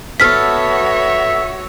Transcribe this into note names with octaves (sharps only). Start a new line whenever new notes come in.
B3 F#4 A4 C#5 E5 F6 B6